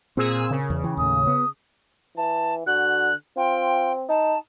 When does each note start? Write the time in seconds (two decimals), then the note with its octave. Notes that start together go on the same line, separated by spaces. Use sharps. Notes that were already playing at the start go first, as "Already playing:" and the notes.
0.17 A#2 C4 G#4 E6
0.51 C#3 A#4
0.70 E2
0.84 E3 G5
0.97 D#2 A2 D#6
1.27 B3
2.17 E3 A5
2.66 D3 F#4 F#6
3.37 C4 F4 G5
4.09 D#4 A5